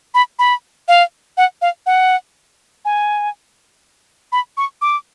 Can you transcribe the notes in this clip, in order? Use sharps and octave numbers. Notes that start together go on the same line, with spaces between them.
B5
B5
F5
F#5
F5
F#5
G#5
B5
C#6
D6